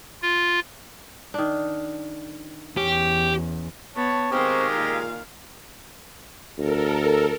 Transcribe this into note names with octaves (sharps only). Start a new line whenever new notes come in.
F4
D#3 D4
E2 C#4 G4
B3 C#5 A5 C#6
D#3 G#3 C4 D#4 G4 F5
A#2 F4
D2 A4 A#4